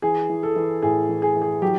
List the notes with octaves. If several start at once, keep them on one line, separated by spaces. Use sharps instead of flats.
E3 G#4
E3
A4
E3
A2 G#4
E3
G#4
E3
G#4
F#3 G4